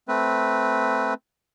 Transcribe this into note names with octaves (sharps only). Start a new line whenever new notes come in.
A3 C4 B4